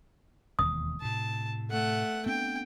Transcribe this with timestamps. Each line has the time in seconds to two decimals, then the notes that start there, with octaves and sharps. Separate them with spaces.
0.59 E1 D#2 D#6
1.02 A2 C3 A5
1.70 A3 F#5
2.26 B3 C4 D4 G5